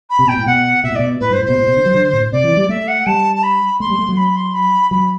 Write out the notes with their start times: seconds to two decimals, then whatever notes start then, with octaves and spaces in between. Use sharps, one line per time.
0.10 B5
0.19 C3
0.28 B2 G5
0.37 A2
0.46 B2 F#5
0.84 B2 E5
0.91 A2
0.95 B2 D5
1.20 A2 B4
1.30 G2 C5
1.39 A2
1.45 B2 C5
1.58 A2
1.67 B2
1.77 D3
1.86 F#3
1.94 D3
2.13 A2
2.32 C3 D5
2.44 E3
2.57 G3
2.69 A3 E5
2.88 F#5
3.06 G3 A5
3.36 A5
3.43 B5
3.80 A3 C6
3.90 G3
3.99 A3
4.09 F#3
4.17 B5
4.36 C6
4.54 B5
4.91 F#3 B5